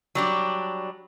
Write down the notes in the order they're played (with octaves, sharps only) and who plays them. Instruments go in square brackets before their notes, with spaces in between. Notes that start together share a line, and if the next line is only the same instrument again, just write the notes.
[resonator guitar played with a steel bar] F#3 G3 D4